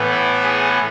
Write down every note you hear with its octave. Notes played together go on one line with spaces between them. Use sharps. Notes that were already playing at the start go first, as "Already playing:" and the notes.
Already playing: A2 E3 B3
E4
G#4